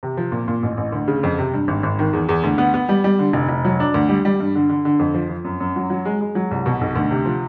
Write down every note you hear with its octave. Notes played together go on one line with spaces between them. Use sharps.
C3
F3
A#2
A#2
A1
A1
D2
C#3
F2
C3
G2
G#1
G#1
D#3
E2
E2
D2
B3
B3
G3
G3
D3
F1
F1
F#3
D4
D2
G3
G3
G2
D3
D3
D3
F2
F3
F3
F#2
F#2
F#3
F#3
G#3
G#3
F#3
C2
B2
B1
D2
C3
F3